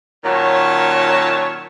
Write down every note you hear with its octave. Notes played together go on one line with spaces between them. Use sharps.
A#2 D#3 F#3 C#4 C#5 A5